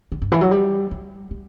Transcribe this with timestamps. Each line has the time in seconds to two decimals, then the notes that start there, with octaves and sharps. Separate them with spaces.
0.12 D3
0.22 G2
0.32 E3
0.41 F#3
0.51 G3
0.91 G3
1.31 G3